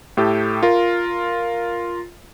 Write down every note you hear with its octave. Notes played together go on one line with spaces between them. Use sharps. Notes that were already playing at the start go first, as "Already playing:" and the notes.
A2 G4 A4
F4 A#4